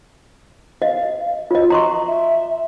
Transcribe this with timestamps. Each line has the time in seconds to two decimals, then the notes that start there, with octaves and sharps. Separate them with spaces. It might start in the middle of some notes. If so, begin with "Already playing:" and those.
0.82 D#5 F5
1.51 F4 C#5 D#5
1.70 D#5 A#5 C6 C#6
2.07 E5